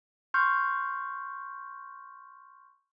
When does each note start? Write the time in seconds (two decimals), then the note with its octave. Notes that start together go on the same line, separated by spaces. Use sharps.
0.34 C6 C#6 F6 G6